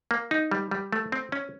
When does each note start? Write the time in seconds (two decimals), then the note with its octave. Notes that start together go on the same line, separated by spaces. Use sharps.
0.11 A#3
0.31 D#4
0.51 G3
0.71 G3
0.93 A3
1.12 C4
1.32 C#4